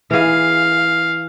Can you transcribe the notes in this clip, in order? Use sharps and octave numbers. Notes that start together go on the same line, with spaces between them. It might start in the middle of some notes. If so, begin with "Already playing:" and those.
E3 G#4 F5